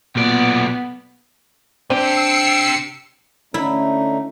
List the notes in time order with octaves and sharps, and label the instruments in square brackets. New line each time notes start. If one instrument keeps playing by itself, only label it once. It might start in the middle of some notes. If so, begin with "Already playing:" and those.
[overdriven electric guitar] B1 D5 [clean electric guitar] A#2 [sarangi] B3
[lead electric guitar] C3 G4 [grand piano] C4 [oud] D4 [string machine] E6 C7 C#7
[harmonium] D3 A3 D#4 [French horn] C#4 [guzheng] E4